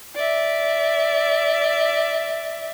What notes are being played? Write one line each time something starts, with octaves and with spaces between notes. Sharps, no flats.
D5 E5